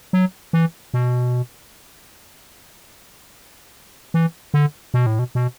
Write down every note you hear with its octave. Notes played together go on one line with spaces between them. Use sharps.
F#3
E3
B2
E3
D3
B2
A2
B2
B2